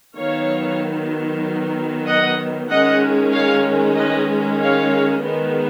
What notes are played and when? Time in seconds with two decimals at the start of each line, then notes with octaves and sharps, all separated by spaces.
0.16 D#3 F#3 B3 C#5 F5
2.06 D#5 F#5
2.69 D#3 G#3 C#4 D#5 F#5
3.33 C#5 F5
3.96 B4 D#5
4.59 C#5 F5
5.22 D#3 G#3 B3